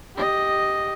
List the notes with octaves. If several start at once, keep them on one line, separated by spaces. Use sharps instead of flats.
G4 D#5